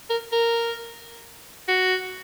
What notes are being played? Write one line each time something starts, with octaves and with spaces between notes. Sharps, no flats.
A#4
A#4
F#4